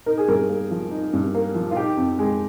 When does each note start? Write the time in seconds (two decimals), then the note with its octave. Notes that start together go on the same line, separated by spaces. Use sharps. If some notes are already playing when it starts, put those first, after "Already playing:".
0.06 D#4 A#4
0.18 G#4
0.28 G2 A#4
0.49 A#3
0.71 F3
0.91 D#4
1.13 G2
1.35 A#3
1.55 F3
1.71 F4
1.76 D#4 G4
1.97 F2
2.19 G#3